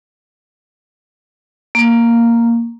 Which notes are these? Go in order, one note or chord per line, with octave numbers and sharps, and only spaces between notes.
A#3